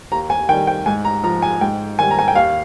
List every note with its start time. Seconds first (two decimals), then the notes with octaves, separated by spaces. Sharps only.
0.12 D#2 A#5
0.30 G#5
0.49 D#3 G5
0.53 G3
0.67 G5
0.86 G#2 G#5
1.05 A#5
1.24 F3 A#5
1.42 G#5
1.61 G#2 G5
1.99 D#3 G3 G#5
2.11 A#5
2.19 G#5
2.28 G5
2.35 D#2 F5